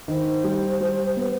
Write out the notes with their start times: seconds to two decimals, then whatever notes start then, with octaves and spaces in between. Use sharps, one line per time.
0.08 D#3 C5
0.44 G3
0.81 G3
1.17 B3